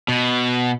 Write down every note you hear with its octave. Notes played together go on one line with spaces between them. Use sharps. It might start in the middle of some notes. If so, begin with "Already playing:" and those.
B2